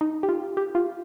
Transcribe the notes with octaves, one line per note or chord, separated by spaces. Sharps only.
D#4
G4
F4
G4
F4